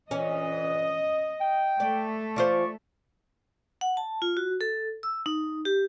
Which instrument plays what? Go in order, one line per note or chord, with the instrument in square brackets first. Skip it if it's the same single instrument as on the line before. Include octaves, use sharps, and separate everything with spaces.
[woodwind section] D2 A#2 E3 [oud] C#4 [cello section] D#5
[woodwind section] G5
[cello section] A3 [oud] D5
[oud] E3 F4 C5 [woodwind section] D5 C#6
[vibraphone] F#5
A5
F4
F#4
A4
E6
D#4
G4